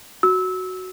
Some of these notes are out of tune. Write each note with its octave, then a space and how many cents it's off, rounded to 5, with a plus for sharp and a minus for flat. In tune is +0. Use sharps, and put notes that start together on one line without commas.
F#4 +0 E6 -20